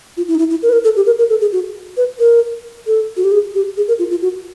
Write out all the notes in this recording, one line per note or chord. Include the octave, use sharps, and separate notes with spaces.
F4
E4
D#4
E4
E4
A#4
B4
A#4
A4
G4
A#4
A#4
A4
G#4
F#4
B4
A#4
A4
F#4
G4
G#4
G4
G#4
A#4
F4
F4
F#4